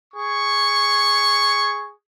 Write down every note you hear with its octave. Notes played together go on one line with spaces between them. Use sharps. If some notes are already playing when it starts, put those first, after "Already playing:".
G#4 C#6